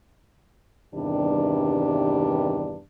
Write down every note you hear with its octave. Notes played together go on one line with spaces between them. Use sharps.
E2 G2 C3 D#3 G3 D4